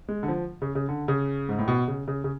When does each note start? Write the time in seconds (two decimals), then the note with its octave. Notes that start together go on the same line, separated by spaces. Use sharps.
0.09 G#3
0.23 D3
0.28 F3
0.62 C#3
0.75 C#3
0.89 D3
1.08 C#3
1.49 G#2
1.58 A2
1.68 B2
1.88 C#3
2.08 C#3
2.24 C#3